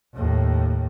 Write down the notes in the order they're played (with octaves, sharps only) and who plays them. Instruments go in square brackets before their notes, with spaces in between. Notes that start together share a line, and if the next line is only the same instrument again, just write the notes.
[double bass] D#2 A2